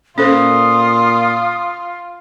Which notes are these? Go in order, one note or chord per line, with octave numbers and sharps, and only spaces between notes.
A#2 C#4 F4 A4 C5 D#6